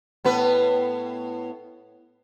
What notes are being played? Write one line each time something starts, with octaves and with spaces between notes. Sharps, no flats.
A2 B3 B4